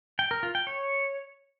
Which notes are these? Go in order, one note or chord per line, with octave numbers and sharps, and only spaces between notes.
G5
A#4
F4
G5
C#5